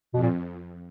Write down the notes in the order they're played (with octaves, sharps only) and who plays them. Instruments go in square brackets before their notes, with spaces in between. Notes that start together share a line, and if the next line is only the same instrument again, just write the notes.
[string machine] F2 [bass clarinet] B2
[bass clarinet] A#2